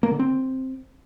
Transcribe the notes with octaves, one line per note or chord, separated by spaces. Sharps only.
A#3
D3
C4